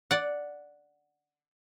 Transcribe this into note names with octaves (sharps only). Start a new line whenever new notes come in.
D5 F#5